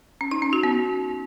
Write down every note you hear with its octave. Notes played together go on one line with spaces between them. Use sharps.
C#4
D#4
C#4
F#4
B3